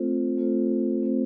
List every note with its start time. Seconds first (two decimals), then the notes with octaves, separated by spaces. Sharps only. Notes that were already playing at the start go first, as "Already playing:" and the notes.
Already playing: A3 C4 F4 A4 C5
0.38 A3 C4 F4 A4 C5
1.02 A3 C4 F4 A4 C5